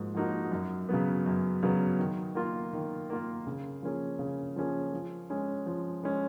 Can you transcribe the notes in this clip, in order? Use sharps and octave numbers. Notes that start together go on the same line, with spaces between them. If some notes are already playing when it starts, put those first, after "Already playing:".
Already playing: G#2 F3 A#3 F#4
F3 A#3 D#4 F#4
F#2
C#3 F#3 B3
F#2
C#3 F#3 B3
D#3
A#3 F4
D#3
A#3 F4
C#3
F3 A#3 C#4 G#4
C#3
F3 A#3 C#4 G#4
F3
G#3 C#4
F3
G#3 C#4